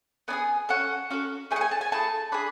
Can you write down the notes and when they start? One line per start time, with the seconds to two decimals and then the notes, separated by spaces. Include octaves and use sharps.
0.28 B3 D4 G#5
0.33 G#4
0.69 C#4 F#4 A4 F#5
1.10 C#4 F#4 A4
1.51 A3 E4 G#4 G#5
1.56 F#5
1.61 G#5
1.71 A5
1.81 G#5
1.92 A3 E4 G#4 A5
2.32 D4 G#4 B5